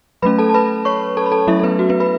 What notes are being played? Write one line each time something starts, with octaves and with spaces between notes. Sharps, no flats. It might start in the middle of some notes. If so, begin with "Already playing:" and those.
F#3 A3 C#4 B4 B5
A4 A5
A5
B4 B5
C#5 C#6
A4 A5
B5
A4 A5
F#3 A3 C#4 E4 E5
A4
B3 B4
F#4
B3 B4
B4 B5